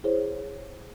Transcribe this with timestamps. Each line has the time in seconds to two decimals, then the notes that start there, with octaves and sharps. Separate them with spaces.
0.04 E4 G#4 C5 C#5